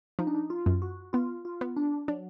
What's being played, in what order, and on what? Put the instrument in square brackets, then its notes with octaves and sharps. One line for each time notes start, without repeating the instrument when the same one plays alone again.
[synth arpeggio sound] F3 [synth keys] D#4
[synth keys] D4
D#4
F4
[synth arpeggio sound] F#2
[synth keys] F#4
[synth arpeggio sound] B3 [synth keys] F4
[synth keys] F4
[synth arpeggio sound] B3
[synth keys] D4
[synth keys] F#3 [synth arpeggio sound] D4